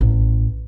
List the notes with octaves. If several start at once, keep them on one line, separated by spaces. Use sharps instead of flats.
A1